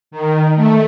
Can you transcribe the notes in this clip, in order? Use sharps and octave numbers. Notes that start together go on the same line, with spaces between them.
D#3
A3